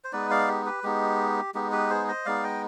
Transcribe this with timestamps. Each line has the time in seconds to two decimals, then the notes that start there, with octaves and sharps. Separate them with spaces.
0.04 C5
0.13 G#3 B3 D#4 B4 D5
0.31 D5 F5
0.48 G4
0.66 G4 B4
0.84 G#3 B3 D#4 G4
1.55 G#3 B3 D#4 G4
1.72 G4 B4
1.90 G#4 C5
2.08 C5 D#5
2.25 G#3 B3 D#4 D5 F5
2.44 D#5 G5